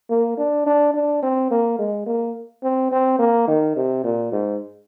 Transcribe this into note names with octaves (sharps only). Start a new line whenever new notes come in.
A#3
D4
D4
D4
C4
A#3
G#3
A#3
C4
C4
A#3
D#3
C3
A#2
G#2